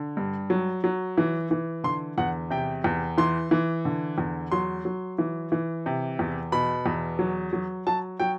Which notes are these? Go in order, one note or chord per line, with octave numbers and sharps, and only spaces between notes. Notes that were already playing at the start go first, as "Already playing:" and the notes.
Already playing: D3
G2
F#3
F#3
E3
E3
D3 C6
E2 F#5
C3 G5
E2
E3 C6
E3
D3
E2
F#3 C6
F#3
E3
E3
C3
E2
B2 B5
E2
F#3
F#3
F#3 A5
F#3 G5